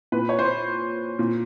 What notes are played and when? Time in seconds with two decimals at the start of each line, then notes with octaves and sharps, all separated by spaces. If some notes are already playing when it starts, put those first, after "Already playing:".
0.12 A#2 B4
0.29 C#5
0.39 C5
1.19 A#2